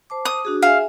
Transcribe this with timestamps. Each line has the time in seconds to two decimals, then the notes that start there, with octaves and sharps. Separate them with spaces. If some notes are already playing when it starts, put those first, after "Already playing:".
0.10 C5 A5 D6
0.25 D#6
0.45 D4 F#4 G#4
0.62 G#4 E5 F5 G#5